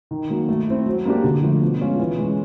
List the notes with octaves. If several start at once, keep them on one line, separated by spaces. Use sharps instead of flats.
D#3
F#3 A#3
A3
C4 E4
F#3
A#3 D4 G4
D3
F3 A3
B2
G#3 C#4 F4
E3
G#3 C#4